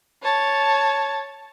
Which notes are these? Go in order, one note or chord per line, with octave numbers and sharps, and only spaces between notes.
C#5 A5